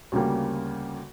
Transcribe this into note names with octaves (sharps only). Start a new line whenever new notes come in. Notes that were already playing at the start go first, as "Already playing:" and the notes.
D2 C#3 G3 A#3